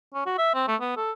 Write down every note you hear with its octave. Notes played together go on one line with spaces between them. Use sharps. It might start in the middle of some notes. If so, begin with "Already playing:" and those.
C#4
F#4
E5
C4
A3
B3
A4